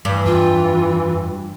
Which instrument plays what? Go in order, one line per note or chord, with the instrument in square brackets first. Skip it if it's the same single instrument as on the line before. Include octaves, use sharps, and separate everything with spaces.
[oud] G2 [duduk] E3
[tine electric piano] F2 [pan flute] F4